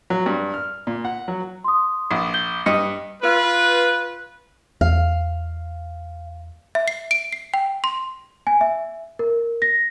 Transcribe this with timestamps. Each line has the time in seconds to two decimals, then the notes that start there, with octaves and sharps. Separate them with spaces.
0.10 F#3
0.26 G2
0.54 F6
0.87 A#2
1.05 F#5
1.28 F#3
1.64 C6 D#6
2.11 A#1
2.34 G6 G7
2.66 G2 D#5 C#7
3.22 F4 B4
4.81 E2 F5
6.75 E5
6.88 C7
7.11 D7
7.33 C7
7.54 G5
7.84 C6
8.47 G#5
8.61 E5
9.19 A#4
9.62 A#6